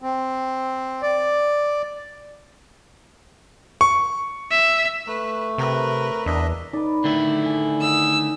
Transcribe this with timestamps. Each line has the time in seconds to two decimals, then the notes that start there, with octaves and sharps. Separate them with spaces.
0.02 C4
1.02 D5
3.81 C#6
4.51 E5
5.07 A3 B4
5.58 C3 A#4 B4
6.26 E2 D4 D#5 E5
6.73 D#4 B4 D5
7.04 D3 D#3 A3 E4
7.45 G#4
7.81 D#5 F#5 E6